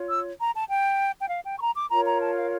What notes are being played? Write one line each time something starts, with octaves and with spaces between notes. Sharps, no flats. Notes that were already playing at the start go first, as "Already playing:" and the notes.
Already playing: F4 C#5
E6
A#5
A5
G5
G5
F5
G5
C#6
A#5
D6
F4 A#4 C#5 A#5
A#5
A5
F5